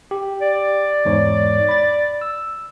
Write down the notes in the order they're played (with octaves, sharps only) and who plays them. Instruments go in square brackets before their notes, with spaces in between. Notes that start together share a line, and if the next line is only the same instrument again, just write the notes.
[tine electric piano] G4
[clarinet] D5
[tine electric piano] E2 G#2 C#5
B5 A6
E6